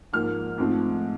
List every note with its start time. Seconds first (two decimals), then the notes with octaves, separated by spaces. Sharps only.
0.13 G#2 F3 A#3 F6
0.58 G#2 F3 A3 C4